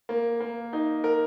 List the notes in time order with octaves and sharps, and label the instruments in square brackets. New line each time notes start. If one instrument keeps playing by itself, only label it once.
[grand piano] A#3
A#3
D#4
A#4